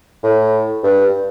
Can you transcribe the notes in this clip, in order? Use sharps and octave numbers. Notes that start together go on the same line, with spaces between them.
A2
G2